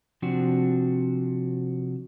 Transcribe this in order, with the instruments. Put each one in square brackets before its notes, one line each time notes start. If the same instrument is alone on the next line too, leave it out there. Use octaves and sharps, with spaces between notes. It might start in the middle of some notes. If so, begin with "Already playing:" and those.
[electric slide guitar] C3 F3 C4 D4 F#4